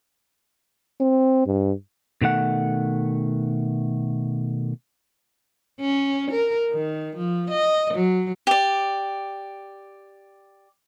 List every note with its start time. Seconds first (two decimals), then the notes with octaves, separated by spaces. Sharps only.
1.00 C4
1.46 G2
2.21 B2 D#3 A3 F#5
5.80 C#4
6.31 A#4
6.71 D#3
7.16 F3
7.51 D#5
7.94 F#3
8.47 G4 D5